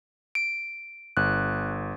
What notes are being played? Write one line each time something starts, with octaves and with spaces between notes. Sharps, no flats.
D7
G1 F#6